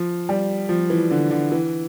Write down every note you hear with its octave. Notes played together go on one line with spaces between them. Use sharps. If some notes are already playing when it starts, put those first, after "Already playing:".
Already playing: F3
G3
F3
E3
D3
D3
E3